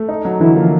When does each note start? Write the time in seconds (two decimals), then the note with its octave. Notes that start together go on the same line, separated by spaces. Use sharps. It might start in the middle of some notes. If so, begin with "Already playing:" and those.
Already playing: A3
0.09 D#4
0.25 F#3
0.40 D3 E3 E4
0.56 F3 A#3 F4